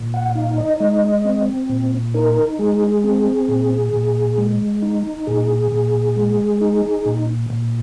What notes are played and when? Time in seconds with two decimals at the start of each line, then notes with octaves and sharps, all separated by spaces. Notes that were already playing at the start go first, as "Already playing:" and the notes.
Already playing: A#2
0.14 F#5
0.35 D#4 F5
0.58 D#5
0.80 G#3 D#5
1.25 C4
1.69 A#2
2.14 D#4 A#4
2.59 G#3 G#4
3.04 C4
3.48 A#2
3.93 A#2
4.38 G#3
4.82 D#4
5.27 A#2 G#4
5.72 A#2
6.17 G#3
6.61 D#4
7.06 A#2
7.50 A#2